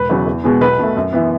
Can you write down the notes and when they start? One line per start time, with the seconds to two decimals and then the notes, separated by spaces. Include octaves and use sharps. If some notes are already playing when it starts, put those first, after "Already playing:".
Already playing: E1 B4
0.09 E2 C#3 F#3
0.26 E2
0.44 B2 G#3 B3
0.61 B1 B4
0.79 B2 A3
0.96 F#2
1.13 E3 B3